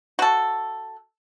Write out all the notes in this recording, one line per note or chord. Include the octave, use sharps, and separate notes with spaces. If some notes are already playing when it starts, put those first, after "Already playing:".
F#4 A4